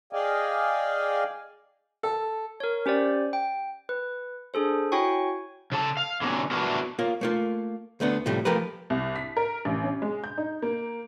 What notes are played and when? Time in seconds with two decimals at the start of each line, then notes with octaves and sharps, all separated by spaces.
0.13 G#4 D5 D#5 F5 G5 G#5
2.03 A4
2.60 A#4 C#5
2.86 C#4 G4 C5 D5
3.33 G5
3.89 B4
4.54 D4 G#4 A4 C5
4.92 E4 F#4 C#5 G5 G#5 C#6
5.72 C#3 A4 A5
5.97 F5
6.21 D3 F#3 B3 C#4
6.51 A3 B3 D4 E4 F#4 A#4
6.99 A#3 F4 C#5
7.21 A3 A#3 F4
8.00 D2 A3 B3 D4
8.26 A2 C3 F3 G3 A3
8.45 F3 A3 G4 A#4 B4
8.90 C2
9.16 B6
9.37 A#4
9.65 A1
9.84 C#4
10.02 G#3
10.24 G6
10.38 D#4
10.62 A#3